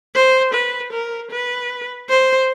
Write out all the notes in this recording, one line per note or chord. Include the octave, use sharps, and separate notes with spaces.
C5
B4
A#4
B4
C5